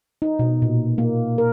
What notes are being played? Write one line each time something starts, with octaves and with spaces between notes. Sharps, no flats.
D#4
B2
A#2
A#3
A#4